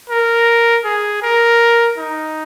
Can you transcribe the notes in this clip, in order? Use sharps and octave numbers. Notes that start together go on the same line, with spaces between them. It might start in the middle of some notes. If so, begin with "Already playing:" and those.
A#4
G#4
A#4
D#4